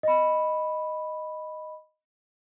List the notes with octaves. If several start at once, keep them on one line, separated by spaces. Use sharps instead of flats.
D#5 B5